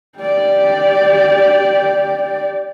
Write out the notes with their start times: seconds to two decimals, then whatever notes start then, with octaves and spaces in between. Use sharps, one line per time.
0.19 G4 D5